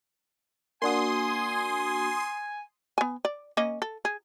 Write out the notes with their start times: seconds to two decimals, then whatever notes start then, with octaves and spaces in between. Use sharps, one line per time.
0.82 A#3 D4 F#4 G#5 C6 D#6
2.98 B3 G#5
3.25 D5
3.57 A#3 C#4 D#5
3.82 A4
4.05 G#4